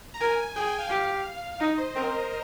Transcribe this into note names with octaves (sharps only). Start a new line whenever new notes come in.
A#5
A#4 G#5
G#4 G5
G#5
F5
G4
D#4 D#5
C5
C4 A#4